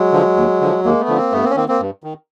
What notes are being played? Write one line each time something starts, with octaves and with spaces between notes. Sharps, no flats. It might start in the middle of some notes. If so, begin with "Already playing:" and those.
Already playing: F#3 G#3
D3 F3
D#2
D3 F3
D#2 G#3 A#3
A3 B3
D3 F3
A#3 C4
G2 A3 B3
A#3 C4
C#4
D#3 A#3 C4
A#3 C4
G2
D#3